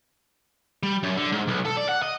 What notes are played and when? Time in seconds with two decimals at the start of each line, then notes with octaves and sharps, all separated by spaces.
0.83 G3
1.03 F#2
1.17 D3
1.33 G#2
1.48 B1
1.66 A4
1.77 D5
1.89 F#5
2.03 D#5